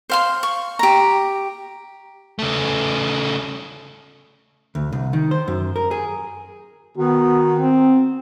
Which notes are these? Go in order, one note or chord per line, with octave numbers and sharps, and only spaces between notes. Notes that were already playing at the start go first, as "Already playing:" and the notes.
C5 F5 C6
C#6
G4 A#5
C#3 A3
D2
C2
D#3
C5
F#2
A#4
G#4
D#3 B3 F#4
C4